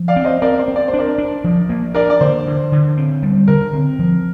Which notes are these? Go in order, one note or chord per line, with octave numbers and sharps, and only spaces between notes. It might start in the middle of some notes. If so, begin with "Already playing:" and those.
Already playing: F3
D5 F5
C4
C5 D#5
C4 A#4 D5
C5
C4
D5
C5
D4
A#4 D5
D4
F3
A#3
D4 A#4 D5
D5
D3 C5
D3
D3
C4
G3
D3 A#4
C4
F3